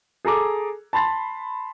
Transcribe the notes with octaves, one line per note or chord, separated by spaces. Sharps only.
G#4 A4 A#5 D6
A5 B5 C6 A6